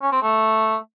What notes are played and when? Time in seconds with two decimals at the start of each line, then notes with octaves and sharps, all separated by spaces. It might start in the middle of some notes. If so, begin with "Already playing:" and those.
0.02 C#4
0.12 C4
0.22 A3